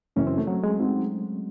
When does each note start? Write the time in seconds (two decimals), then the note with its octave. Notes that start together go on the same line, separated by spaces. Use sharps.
0.16 F#2 C#3 E3 C#4
0.27 C4
0.38 A3
0.47 F#3
0.63 G#3
0.79 F#3 C4 D#4 F#4